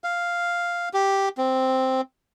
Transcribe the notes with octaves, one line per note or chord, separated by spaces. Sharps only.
F5
G4
C4